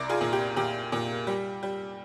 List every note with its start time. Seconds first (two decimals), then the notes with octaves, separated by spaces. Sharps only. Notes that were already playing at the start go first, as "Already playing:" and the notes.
Already playing: C2 A#4 D5
0.09 F4 G#4
0.21 A#2
0.33 G4
0.56 A#2 G4
0.92 A#2
1.27 G3
1.63 G3